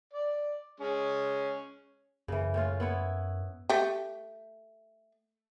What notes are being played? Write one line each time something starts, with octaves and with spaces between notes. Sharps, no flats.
D5
G#3 C#4
F#2 C#3 E3
A2 C#4 F4
B3 E4 C#5
A3 G4